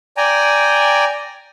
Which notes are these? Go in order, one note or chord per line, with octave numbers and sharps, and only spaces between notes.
D5 G5 G#5 A#5